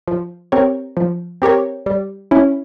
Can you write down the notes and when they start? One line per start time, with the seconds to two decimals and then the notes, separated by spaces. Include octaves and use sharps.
0.08 F3
0.52 C4 G4 A#4 C#5
0.97 F3
1.42 C4 G4 A#4 C#5
1.86 G3
2.31 C#4 E4